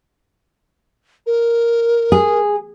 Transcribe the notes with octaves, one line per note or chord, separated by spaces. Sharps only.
A#4
G#4